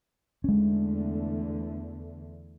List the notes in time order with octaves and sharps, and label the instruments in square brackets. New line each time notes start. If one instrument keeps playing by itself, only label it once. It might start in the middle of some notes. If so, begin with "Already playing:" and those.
[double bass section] E2 D3 A3 [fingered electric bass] G#3 C#4